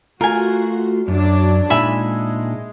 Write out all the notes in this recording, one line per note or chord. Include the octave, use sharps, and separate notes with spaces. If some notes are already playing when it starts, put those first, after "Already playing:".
A3 F4 F#4 A#4 G#5
F#2 F#3 D4
A#2 G#3 D4 D#4 E5 G#5 B5